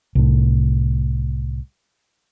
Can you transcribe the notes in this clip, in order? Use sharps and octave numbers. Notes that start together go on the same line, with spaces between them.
C2 A2